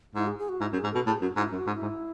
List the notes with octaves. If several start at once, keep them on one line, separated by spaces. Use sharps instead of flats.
G#2 E4
G#4
G#4
F#4
G#2 E4
F#2
G#4
G#2
B2 A4
A2 G#4
F#2 F#4
G#2 E4
F#2 F#4
G#2
E4
G#2